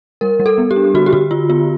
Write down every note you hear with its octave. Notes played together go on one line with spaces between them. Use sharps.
G3 A#4
G3
A4
B3
G4
D4
D3 F#4
G4
D3 F#4
D3 F4
B3 F4